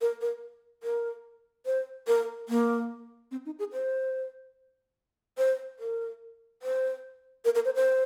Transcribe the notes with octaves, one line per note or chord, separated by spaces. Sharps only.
A#4
A#4
A#4
C5
A#4
A#3
C4
D#4
G#4
C5
C5
A#4
C5
A#4
A#4
C5
C5